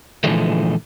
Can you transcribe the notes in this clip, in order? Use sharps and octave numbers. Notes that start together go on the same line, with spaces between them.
A#2 D3 E3 F3 G#3 A3